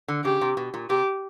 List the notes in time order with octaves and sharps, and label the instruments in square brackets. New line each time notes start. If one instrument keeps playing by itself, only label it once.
[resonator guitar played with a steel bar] D3
[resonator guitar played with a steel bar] C#3 [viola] G4
[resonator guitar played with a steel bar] C3
B2
A#2
[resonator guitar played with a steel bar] C3 [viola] G4